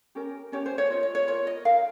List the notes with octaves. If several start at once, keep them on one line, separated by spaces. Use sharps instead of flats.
C#4 G4 A#4
C#4 G4 A#4 C#5
C5
C#5
F4 A#4 D#5
C#5
C#5
F4 A#4 C#5
D#5
D#4 A#4 F5